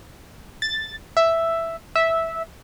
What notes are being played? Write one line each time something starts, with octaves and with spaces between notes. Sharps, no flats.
A6
E5
E5